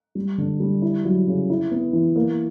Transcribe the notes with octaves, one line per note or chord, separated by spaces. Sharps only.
G3
D3
G3
E4
F#3
C#3
E4
B3
E3
A#3